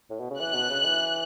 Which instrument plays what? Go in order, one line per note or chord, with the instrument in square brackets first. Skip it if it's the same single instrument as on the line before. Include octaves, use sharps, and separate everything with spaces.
[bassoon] A2
B2
C#3
[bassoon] E3 [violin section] F#6
[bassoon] B2
C#3
E3